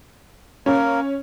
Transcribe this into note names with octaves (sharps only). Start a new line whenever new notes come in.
A#3 C#4 A#4